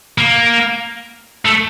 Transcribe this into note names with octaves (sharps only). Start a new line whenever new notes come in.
A#3
A3